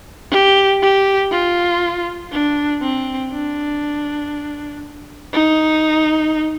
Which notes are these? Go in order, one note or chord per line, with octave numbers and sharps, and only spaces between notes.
G4
G4
F4
D4
C4
D4
D#4